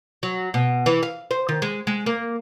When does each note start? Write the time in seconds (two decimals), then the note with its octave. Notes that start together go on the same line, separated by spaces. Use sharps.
0.23 F#3
0.54 B2
0.86 E3
1.03 F5
1.31 C5
1.49 D#3
1.62 G#3
1.87 G#3
2.06 A#3